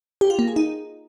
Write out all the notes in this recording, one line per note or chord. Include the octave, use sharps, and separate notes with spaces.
G4
F4
A#3
G#4
D#4